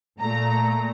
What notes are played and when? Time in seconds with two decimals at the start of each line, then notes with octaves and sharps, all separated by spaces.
0.20 A#2 A3 A#5